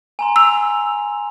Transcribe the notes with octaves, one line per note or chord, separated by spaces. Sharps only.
G#5 A#5 C6
E6 F7